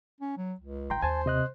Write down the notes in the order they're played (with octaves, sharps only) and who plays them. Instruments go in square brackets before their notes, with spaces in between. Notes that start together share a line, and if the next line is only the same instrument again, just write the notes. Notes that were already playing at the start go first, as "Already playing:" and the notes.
[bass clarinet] C#4
F#3
C#2
[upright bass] A1 D#3 [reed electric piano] G5 A#5 C6
[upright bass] D#2 [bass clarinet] C5 [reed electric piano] G#5 A5
[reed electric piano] C3 D#5 F#6